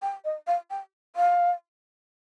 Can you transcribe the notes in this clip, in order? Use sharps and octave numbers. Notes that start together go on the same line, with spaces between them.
G5
D#5
F5
G5
F5